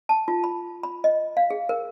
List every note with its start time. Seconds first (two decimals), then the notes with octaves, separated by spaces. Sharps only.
0.09 A5
0.28 F4
0.44 B5
0.83 B5
1.04 D#5
1.37 F5
1.50 G#4
1.69 A#4